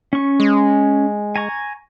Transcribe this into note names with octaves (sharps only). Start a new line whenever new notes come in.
C#4 C#6
G#3
G#5 A#5 C#6